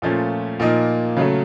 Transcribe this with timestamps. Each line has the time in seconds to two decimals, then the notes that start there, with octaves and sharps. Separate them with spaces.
0.02 A#2 F3 A3 C#4
0.60 A#2 F3 A#3 D#4
1.16 C#3 F#3 A3